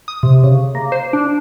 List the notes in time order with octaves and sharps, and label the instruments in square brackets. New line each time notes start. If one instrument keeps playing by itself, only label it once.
[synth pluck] D#6
C3
C#3
A#3
C5
D4